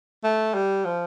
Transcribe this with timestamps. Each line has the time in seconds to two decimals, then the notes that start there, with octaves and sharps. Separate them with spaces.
0.24 A3
0.54 G3
0.86 F3